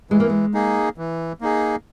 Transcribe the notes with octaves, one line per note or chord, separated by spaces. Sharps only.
E3 G#3
A#3
G#3
A#3 D#4 G#4
E3
A#3 D#4 G#4